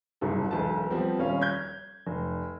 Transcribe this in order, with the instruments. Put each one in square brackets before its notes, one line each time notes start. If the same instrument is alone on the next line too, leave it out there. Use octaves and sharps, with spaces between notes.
[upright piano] F#1 C2 G#2 A4
E1 B1 B4 A5
F3 G3 B3 C4
D#1 C#4 F5
G6 G#6
F1